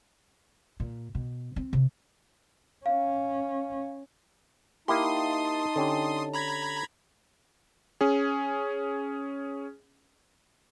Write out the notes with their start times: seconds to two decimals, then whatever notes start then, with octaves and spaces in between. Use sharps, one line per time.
0.80 A#2
1.15 B2
1.56 C4
1.73 C3
2.86 C#4 F5
4.88 A#3 D#4 E4 G4 A5 C6 D#6
5.76 D3 C#4 G4
6.34 A#5 B5 G#6
8.01 C#4 G#4